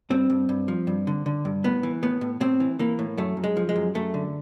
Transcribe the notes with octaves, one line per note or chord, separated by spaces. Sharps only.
G2 C4
G2
G2
F3
G2
D3
D3
G2
A2 B3
E3
A2 B3
A2
A2 C4
E3
E3 A#3
A2
F#2 A3
F#2
G#3
F3
G#3
F#2
F#2 A3
D3